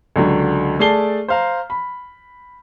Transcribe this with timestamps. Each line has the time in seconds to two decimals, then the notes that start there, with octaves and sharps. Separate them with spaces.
0.16 C#2 D3 F#3
0.79 A3 G#4 D5 A5 C7 G7
1.28 C5 F5 A#5
1.70 B5